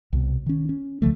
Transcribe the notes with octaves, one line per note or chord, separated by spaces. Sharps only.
C2 B2
D#3 C#4
C#4
C#2 D3 F3 A3